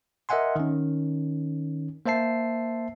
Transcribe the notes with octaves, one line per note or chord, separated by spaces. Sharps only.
A#4 D#5 E5 F#5 G#5 C6
D#3 C#4
A#3 C5 E5 A5 C7